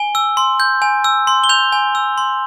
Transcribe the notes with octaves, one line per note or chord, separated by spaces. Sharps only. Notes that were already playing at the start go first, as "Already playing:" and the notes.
Already playing: G#5 G7
E6
C6
G6
G#5
E6
C6
G7
G6 F7
G#5
E6
C6